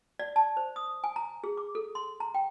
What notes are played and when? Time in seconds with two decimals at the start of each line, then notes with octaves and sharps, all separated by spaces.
0.19 D5
0.36 A5
0.57 C5
0.76 D#6
1.04 G#5
1.16 A#5
1.44 G#4
1.57 D6
1.75 A4
1.95 C6
2.20 A#5
2.34 G5